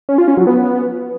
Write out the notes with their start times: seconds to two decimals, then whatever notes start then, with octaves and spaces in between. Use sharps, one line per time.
0.09 C#4
0.18 F4
0.28 C#4
0.37 F#3
0.47 B3